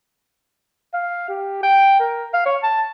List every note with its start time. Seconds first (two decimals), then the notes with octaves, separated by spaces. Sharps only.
0.94 F5
1.29 G4
1.63 G5
2.00 A#4
2.33 F5
2.45 C#5
2.63 A5